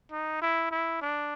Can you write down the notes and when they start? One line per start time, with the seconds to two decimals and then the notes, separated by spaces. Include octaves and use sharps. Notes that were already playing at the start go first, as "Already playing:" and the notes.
0.12 D#4
0.41 E4
0.71 E4
1.01 D4